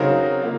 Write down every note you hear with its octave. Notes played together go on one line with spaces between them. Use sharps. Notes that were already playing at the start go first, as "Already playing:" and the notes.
Already playing: C#3 F#3 C4 D#4 A#4
A#3 F4